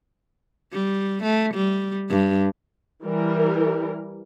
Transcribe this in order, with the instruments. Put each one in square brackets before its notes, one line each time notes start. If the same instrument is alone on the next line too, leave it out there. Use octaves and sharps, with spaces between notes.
[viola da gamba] G3
A3
G3
G2
[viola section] E3 G3 A#4